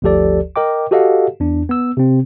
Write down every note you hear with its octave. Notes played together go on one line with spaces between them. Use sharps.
G1 D2 F3 G4 A4 D5
A#4 D#5 G5 D6
F#4 G4 A4 D#5 F5 F#5
E2 D4
B3 E6
C3 C4